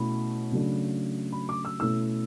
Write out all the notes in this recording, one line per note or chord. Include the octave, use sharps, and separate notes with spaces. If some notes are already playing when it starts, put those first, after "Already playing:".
Already playing: B2 A3 C#4 E4 B5
C#3 F#3 A3 D4
B5
D6
E6
B2 A3 C#4 E4 E6